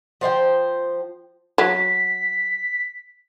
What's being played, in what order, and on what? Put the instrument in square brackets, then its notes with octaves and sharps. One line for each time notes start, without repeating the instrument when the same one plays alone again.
[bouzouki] F3 C5 E5 G5
[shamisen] F#3 [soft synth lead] B6